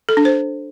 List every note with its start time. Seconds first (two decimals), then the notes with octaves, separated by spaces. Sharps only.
0.09 A4
0.17 D4
0.25 C5